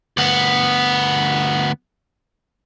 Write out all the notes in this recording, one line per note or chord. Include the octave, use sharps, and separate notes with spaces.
D2 B3